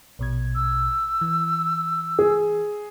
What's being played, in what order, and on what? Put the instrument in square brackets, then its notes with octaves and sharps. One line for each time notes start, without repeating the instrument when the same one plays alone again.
[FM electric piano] A#1 B2 G#6
[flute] E6
[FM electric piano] E3
[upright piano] G#4